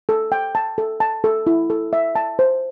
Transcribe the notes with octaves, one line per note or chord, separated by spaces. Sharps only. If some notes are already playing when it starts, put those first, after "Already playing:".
A4
G5
A5
A4
A5
A4
E4
A4
E5
A5
C5